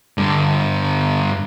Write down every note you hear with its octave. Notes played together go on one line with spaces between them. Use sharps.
G2 D3